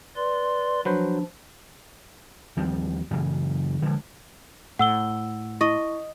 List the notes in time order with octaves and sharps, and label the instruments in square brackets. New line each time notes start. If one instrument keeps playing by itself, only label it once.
[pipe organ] B4 D5 C6
[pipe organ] F3 D4 [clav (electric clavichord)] F#3 B4 C5
[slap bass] D#2 F3 G3 C4
F#2 C#3 E3
D3 F3 G#3
[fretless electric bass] A2 [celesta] F#5 E6 G7
[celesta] E4 C#6 [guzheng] D#5